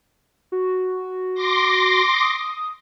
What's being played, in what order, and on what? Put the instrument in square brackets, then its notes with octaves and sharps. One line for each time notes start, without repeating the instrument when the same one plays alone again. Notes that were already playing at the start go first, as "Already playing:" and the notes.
[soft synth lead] F#4
[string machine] C6 D6 A#6
[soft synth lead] D#6